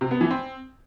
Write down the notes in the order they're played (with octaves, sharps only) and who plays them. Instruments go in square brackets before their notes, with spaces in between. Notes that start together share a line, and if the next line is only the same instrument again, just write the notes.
[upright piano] C3
B3
E3
C4